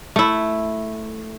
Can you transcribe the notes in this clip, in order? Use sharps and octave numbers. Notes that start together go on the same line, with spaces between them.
A3 E4